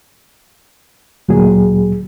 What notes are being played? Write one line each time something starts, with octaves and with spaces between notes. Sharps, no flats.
D2 A#2 F#3 G#4